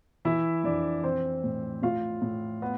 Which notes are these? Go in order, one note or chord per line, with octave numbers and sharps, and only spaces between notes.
E3 E4 E5
F2 D4 D5
E3 C4 C5
A2
A2 F4 F5
A2
B3